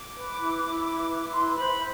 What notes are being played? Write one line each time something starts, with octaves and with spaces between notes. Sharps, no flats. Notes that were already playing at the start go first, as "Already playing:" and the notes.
Already playing: D6
B4
E4
E4
B4
B4
E4 C6
C5 B5